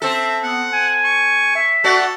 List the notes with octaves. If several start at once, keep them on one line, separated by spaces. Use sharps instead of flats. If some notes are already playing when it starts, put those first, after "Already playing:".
C4 A4 E5
B3 F#5
G#5
C#6
E5
A3 F#4 A4 D5